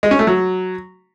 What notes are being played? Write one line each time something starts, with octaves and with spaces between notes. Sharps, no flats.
G#3
C#4
A3
F#3